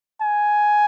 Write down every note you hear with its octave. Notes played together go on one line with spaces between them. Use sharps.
G#5